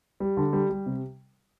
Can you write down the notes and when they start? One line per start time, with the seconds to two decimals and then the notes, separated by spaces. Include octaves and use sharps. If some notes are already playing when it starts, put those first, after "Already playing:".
0.20 G3
0.37 D3
0.53 G3
0.70 G3
0.86 C3